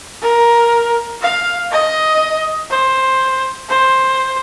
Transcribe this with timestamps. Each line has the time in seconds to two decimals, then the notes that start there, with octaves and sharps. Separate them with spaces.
0.22 A#4
1.22 F5
1.71 D#5
2.70 C5
3.69 C5